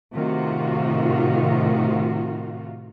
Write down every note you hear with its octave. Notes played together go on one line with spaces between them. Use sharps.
A2 C3 D#3 F4 F#4